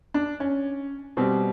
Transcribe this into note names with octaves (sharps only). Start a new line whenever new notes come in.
D4
C#4
B2 G3 C4